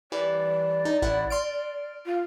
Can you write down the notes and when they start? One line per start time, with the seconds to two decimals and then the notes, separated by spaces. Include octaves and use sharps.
0.12 E3 G3 D5
0.85 D#4
1.02 A1 E4 F#5
1.30 C6 F6 D7
2.06 F4